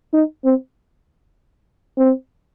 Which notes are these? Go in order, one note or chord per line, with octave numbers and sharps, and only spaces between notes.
D#4
C4
C4